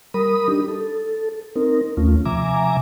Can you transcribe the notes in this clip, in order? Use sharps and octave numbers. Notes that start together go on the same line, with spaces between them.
G3 A#4 B5 D#6
D4 D#4 G4
A4
C4 D#4 A#4
D#2 A3 C#4 F4
C3 F3 E5 G#5 A#5 D6